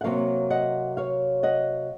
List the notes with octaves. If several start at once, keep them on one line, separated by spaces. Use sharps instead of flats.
F#5
C3 F#3 A#3 C#5 F5
D#5 F#5
C#5 F5
D#5 F#5